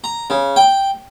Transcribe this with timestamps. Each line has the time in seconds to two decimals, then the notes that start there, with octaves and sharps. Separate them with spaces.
0.04 A#5
0.30 C#3
0.56 G5